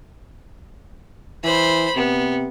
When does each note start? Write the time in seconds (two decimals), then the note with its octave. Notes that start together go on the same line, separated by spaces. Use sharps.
1.44 E3 C5 B5
1.96 C3 B3